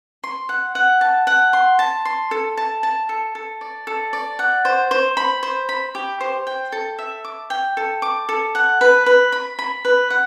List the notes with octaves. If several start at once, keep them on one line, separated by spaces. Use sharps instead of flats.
C6
F#5
F#5
A5
F#5
C6
A5
C6
A4
A5
A5
A4
A4
D5
A4
D5
F#5
C5
C5
B5
C5
B5
G4
C5
G5
A4
E5
D6
G5
A4
D6
A4
F#5
B4
B4
B5
B5
B4
F#5